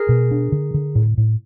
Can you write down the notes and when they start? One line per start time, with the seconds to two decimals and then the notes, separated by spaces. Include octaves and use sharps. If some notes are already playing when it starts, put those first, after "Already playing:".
Already playing: G#4 A#4
0.09 B2
0.31 D4
0.52 D3
0.74 D3
0.95 A2
1.17 A2